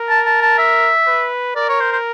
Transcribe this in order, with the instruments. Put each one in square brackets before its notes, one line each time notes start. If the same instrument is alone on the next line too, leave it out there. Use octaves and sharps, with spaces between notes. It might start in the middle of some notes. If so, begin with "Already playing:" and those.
Already playing: [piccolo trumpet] A#4
[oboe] A5
A5
A5
E5
[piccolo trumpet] B4
[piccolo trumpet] A#4 [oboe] D5
[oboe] C#5
C5
C5